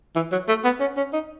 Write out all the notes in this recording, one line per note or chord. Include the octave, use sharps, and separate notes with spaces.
E3
F#3
A3
B3
C#4
C#4
D#4